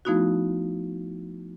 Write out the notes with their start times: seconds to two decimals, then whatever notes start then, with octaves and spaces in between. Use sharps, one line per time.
0.05 F3 A3 B3 D#4 E4 F#4